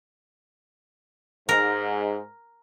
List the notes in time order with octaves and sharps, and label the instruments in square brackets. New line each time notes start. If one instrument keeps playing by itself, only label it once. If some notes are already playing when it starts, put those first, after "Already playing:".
[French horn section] G#2 [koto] A#4